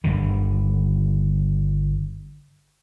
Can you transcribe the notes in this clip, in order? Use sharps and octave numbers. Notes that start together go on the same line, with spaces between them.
G1 G2 D3 D#3